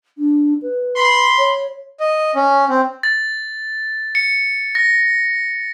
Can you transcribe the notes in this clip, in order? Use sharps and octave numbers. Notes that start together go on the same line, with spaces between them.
D4
B4
B5 C6
C#5
D#5
C#4
C4
A6
C#7
A#6